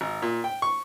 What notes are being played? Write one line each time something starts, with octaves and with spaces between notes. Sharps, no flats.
G#1
A#2
G5
C#6